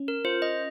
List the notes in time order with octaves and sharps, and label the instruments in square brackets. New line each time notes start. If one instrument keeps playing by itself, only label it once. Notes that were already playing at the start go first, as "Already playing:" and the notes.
Already playing: [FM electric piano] C#4
[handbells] A#4
[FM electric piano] F4 [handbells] C5
[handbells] D#5